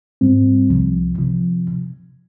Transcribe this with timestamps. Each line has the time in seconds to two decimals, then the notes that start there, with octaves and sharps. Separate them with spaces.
0.21 G#2 G3 C4
0.70 C2 C3 F3
1.18 C3 F3